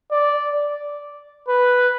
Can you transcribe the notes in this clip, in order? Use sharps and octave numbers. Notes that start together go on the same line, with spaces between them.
D5
B4